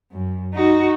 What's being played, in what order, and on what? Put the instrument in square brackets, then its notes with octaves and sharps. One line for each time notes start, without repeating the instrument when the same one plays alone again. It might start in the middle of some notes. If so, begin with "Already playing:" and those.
[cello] F#2
D#4 F#4